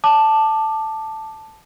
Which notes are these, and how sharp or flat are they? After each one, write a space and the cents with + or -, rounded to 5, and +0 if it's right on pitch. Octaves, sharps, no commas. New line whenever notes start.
A5 +0 D6 +20